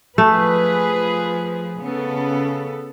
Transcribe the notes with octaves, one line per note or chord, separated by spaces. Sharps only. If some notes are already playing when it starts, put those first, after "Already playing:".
F3 A3 G#4 B4
C#3 B3 A4